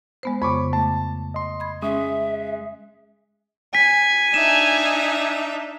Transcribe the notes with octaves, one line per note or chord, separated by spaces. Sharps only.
G#3 B3 C5
F2 C#3 B5 C#6 D6
A3 A5
D#5 C6
B5 G#6
G#3 C#4 E5 D#6
G#5 B6
D4 D#4 E5 E7